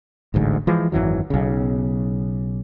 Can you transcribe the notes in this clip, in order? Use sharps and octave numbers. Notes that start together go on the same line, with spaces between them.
D1 A1 D2 G#2
E3 F3 G#3
G#1 F#2 E3 F#3
B1 C#3